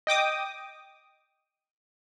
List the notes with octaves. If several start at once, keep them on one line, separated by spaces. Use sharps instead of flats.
D#5 G5 D6 D#6